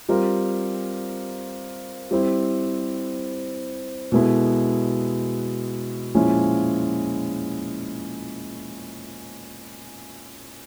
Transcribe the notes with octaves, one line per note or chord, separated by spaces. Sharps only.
G3 C4 F4 A#4
G3 C4 E4
B2 G#3 B3 E4 A4
A#2 F3 G#3 C#4 E4